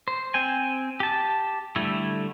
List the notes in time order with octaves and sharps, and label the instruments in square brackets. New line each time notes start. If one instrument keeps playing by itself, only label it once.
[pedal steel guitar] C5
C4 G5 G#5
G4 A5
D3 G3 A3 E4